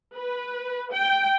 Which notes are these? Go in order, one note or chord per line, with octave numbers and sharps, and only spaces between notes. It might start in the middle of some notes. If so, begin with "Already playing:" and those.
B4
G5